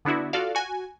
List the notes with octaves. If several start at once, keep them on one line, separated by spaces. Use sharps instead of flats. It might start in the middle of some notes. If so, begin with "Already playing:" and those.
D3 B3 D4 E4 F#4
F4 F#4 A4 D5 F5
F#4 G#5